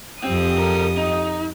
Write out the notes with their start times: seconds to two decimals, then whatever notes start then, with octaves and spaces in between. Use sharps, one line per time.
0.24 F2 C4 G4 D#6
0.58 A4 A#4
0.97 D#4